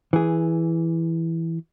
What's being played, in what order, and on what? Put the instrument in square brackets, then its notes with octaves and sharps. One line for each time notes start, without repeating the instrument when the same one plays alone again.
[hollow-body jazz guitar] E3 G#4